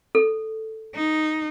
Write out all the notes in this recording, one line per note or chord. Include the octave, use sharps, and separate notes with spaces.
A4
D#4